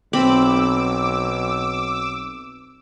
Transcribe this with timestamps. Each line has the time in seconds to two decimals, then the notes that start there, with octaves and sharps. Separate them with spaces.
0.13 B1 C4 B5 D6 E6